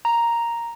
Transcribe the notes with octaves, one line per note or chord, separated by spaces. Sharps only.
A#5